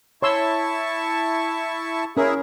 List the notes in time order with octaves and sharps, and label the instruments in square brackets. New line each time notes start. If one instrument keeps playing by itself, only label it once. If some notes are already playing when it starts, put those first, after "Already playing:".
[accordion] E4 A5 C#6 [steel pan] C#5 C6 E6
[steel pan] C#4 A#4 [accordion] E4 G#4